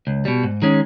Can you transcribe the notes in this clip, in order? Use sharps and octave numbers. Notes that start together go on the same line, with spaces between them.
C#2
B2 G3
G#2
D#3 G#3 C#4